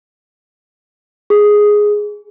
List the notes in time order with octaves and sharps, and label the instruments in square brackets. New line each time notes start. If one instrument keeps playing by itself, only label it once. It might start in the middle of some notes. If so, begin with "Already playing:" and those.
[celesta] G#4